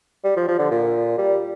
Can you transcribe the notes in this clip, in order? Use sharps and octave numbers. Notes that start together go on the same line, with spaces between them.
G3
F3
F3
D3
A#2
G3